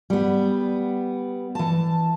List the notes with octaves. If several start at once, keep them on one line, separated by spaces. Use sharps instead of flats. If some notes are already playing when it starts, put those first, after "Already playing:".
G3 B3
E3 A5